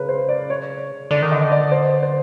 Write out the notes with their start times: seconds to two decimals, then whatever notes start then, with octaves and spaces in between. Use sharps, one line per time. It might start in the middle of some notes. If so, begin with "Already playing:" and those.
Already playing: C#3 A#4 B4
0.09 C5
0.29 D5
0.50 C#5
1.11 D3 D5
1.22 D#3
1.32 D3 D#5
1.52 D5
1.72 C5
2.03 C5